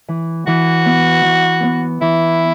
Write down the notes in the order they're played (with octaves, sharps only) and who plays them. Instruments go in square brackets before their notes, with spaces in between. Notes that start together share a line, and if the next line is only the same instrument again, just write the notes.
[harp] E3
[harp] E3 [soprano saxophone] F#4
[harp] B3
E3
B3
[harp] E3 [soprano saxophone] E4